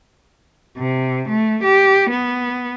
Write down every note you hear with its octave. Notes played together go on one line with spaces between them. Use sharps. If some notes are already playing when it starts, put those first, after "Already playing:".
C3
A3
G4
B3